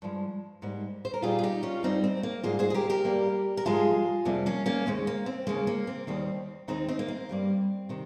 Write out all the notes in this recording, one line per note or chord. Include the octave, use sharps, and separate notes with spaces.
G2 F3 G#3
G#2 G3 A#3
C5
A#4
A#2 G3 A#3 F4 G#4
G#4
D#4 G4
C#4 F4
G2 G3 A#3 C4 D#4
C4
A#3
G#2 G3 A#3 F4 G#4
G#4 C5
G#4
G4 A#4
G4 A#4
G2 G3 A#3
A#4
G#2 F3 G#3 F4 G#4
F2 C3 G3 A#3
A#3 C#4
A#3 C#4
D#2 C#3 G#3 C4
A#3
C4
D#2 C#3 G#3 A#3
A#3
C4
D#2 D#3 G3 A#3 C4
D#2 D#3 G#3 C4 D#4
C4 D#4
A#3
C4
G2 G3 A#3
C3 D#3